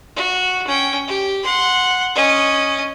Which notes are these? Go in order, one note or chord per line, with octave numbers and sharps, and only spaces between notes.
F#4
C#4 G5
G4
F#5 C6
C#4 D#5